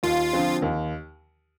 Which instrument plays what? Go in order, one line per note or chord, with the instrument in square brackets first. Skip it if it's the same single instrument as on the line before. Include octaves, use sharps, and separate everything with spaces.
[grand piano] D#2 [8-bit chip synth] F4
[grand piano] D3 F3 C4
D#2